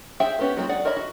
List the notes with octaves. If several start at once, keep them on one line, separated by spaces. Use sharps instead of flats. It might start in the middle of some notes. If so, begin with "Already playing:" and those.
G#4 C5 E5 F5 G5
B3 C#4 G4 B4
F#3 G#3 A#3 C4 F4
G#4 D5 F#5
A#4 C#5 D#5 E5 B5
F#4